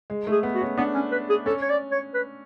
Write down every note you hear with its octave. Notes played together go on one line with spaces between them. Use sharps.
G#3
A3
G#4
B3
F#4
C#4
B3 D4
C#4
B4
G#4
C#4 A4
C#5
D5
C#5
B4